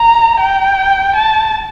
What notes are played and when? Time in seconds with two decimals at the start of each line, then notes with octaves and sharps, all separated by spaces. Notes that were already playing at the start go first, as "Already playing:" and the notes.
Already playing: A#5
0.40 G5
1.16 A5